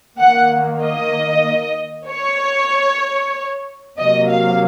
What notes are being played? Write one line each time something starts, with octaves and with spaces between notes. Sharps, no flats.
D#3 A#3 F#5
D#5
C#5
C3 F#3 A#3 D#5
F5